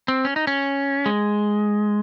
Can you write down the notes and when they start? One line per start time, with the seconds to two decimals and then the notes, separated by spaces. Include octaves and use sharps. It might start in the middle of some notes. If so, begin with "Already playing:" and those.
0.08 C4
0.25 C#4
0.36 D#4
0.47 C#4
1.06 G#3